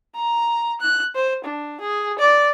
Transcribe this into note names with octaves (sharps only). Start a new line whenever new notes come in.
A#5
F#6
C5
D4
G#4
D5